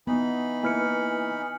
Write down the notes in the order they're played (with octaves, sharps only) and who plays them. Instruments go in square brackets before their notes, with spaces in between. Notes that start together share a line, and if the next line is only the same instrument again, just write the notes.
[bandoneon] E3 D#4 B5 [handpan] B3
[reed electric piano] A#3 E4 B4 [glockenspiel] G#5 F6 C#7